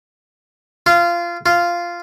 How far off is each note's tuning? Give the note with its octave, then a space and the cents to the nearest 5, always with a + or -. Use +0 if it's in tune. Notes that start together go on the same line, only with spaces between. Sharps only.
F4 -20
F4 -10